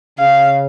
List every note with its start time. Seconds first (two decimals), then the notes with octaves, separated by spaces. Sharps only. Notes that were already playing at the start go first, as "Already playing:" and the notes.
0.18 C#3 F5